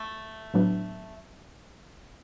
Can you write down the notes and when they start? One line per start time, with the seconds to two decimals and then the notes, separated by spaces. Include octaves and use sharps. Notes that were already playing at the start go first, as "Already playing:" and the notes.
Already playing: A3
0.54 A2 F#3 B3 D4